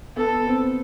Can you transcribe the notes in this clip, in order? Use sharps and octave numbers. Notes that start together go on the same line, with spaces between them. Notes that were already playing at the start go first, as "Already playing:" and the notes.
B3 A4
C4